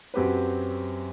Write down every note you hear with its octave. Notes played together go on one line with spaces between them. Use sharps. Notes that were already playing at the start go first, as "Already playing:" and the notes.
F#2 F#3 C4 G4 B4